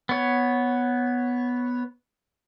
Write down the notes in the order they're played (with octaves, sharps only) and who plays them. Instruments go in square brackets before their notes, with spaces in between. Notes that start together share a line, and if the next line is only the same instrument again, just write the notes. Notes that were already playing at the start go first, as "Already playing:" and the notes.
[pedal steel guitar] B3 C#5